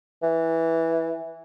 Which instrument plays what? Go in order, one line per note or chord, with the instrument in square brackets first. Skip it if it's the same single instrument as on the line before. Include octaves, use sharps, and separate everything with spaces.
[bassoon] E3